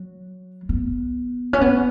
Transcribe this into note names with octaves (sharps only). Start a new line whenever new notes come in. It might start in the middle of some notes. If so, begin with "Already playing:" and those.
Already playing: F#3
B3
C#4
B3